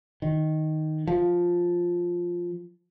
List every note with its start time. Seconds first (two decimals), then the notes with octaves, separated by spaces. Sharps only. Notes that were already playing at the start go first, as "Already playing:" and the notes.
0.22 D#3
1.07 F3